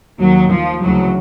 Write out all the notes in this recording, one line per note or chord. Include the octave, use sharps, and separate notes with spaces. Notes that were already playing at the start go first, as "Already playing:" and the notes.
D#2 D#3 F#3
F3
D2 C#3 E3 F#3